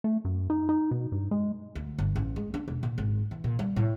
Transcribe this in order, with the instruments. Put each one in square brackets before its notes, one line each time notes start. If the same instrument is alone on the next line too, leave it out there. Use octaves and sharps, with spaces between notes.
[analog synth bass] A3
F#2
D#4
D#4
B2
G2
G#3
[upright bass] D2
G1
A1
G#3
D4
E1
A#2
G#1
E3
A#2
G3
A2